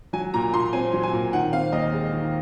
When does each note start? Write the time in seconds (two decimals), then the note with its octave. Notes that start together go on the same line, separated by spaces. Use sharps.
0.13 F#3 G#5
0.34 A#2 A#5
0.54 A#2 C6
0.73 C4 G#5
0.93 F#3
1.03 G#5
1.13 A#2
1.33 D#3 F#5
1.52 C4 F5
1.72 D#2 D#5
1.93 G#3
2.12 D#3